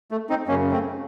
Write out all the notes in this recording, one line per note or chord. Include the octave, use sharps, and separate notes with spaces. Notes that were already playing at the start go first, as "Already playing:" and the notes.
A3
C4 D#4
F#2 C#3 A#3 C#4
A3 C4